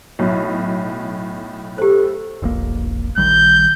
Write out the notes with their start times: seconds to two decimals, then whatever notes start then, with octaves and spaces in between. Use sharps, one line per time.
0.19 B1 A2 C#5
1.78 G4 A4 C5
2.42 E1 A#1 A#3
3.18 A#1 D#3 G3 G6